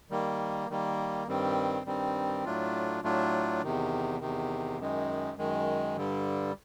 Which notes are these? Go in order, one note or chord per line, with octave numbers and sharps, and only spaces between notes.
D#3 G3 A#3
D#3 G3 A#3
G2 D#3 G3 C4
G2 D#3 G3 C4
A2 F#3 A3 D4 F4
A2 F#3 A3 D4 F4
E2 C3 D#3
E2 C3 D#3
F#2 D#3 G#3
F#2 D#3 G#3
G2 D3 G3